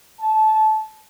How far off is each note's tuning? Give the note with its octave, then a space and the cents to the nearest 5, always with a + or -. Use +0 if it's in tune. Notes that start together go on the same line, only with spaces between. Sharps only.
A5 -20